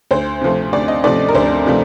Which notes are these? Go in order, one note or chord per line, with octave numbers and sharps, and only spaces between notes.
D2 C5
C3 F3 A3
D2 D5
D#5
C3 F3 A3 D5
A#4
D2 C5
C3 F3 A3